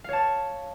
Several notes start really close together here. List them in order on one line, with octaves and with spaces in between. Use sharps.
F5 C#5 A5